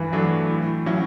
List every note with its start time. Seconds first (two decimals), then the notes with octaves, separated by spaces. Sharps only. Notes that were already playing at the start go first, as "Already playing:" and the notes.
Already playing: G2 E3
0.13 F#3 A3 D4
0.49 A2
0.86 F#3 C#4 E4